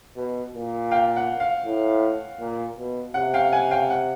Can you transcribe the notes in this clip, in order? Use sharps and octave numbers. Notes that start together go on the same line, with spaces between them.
B2
A#2
F5 G5
F#5
F5
A2
A#2
B2
C3 F#5
F5 G5
F#5 G#5
F5 G5
F#5